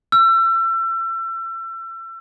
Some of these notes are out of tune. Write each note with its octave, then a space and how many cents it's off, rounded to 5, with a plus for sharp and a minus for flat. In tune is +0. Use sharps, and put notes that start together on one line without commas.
E6 +35